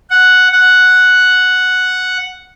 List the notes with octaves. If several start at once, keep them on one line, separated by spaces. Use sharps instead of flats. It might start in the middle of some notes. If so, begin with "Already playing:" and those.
F#5
F#5